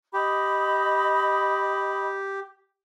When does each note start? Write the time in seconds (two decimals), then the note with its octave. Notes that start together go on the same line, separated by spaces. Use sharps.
0.13 G4 D#5 B5 D#6